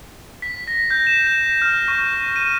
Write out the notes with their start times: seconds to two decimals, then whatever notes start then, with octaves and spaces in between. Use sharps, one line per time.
0.42 B6
0.68 A#6
0.91 G6
1.07 E7
1.27 E7
1.62 F6
1.88 C#6
2.36 D#7